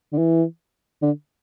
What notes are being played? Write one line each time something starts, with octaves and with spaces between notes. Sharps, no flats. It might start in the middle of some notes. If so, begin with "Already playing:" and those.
D3
E3
D3